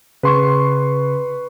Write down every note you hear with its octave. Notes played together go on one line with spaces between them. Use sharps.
C#3 B4 C6 C#6